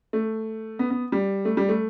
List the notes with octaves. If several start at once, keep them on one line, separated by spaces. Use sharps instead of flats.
A3
B3
B3
G3
A3
G3
A3